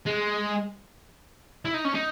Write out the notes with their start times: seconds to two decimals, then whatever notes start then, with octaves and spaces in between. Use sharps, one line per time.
0.07 G#3
1.65 E4
1.74 D#4
1.85 C#4
1.95 D#4